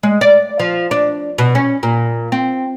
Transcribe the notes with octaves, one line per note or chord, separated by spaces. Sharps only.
G#3
D5
F3
D4
B2
C#4
A#2
C4